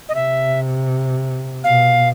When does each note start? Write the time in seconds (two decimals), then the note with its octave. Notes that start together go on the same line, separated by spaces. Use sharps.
0.09 D#5
0.14 C3 E5
1.64 B2 F5